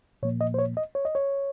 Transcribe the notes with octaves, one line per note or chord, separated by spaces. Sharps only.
A#2 F3 A#3 C#5
D#5
C5
C#5
D#5
C#5
D#5
C#5